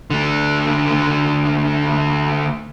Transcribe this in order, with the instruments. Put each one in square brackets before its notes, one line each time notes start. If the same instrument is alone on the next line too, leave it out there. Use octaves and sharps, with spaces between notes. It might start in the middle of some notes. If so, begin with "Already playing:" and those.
[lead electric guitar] D3 A3